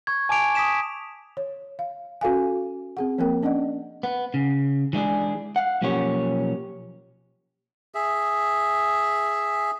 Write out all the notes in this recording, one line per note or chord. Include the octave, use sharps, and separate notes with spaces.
C#6 G#6
G#5 A5 D6 D7 F7
D#6 B6 E7
C#5
F5
C#4 F#4 A4 F5 G#5
C4 G#4 F#5
F3 A#3 C4 A#4 G5
C#4 D4 D5 D#5 F#5
B3
C#3
E3 G#3 D4 G#4
F5 F#5
B1 F3 A#3 C#4 G4 C#5
G#4 E5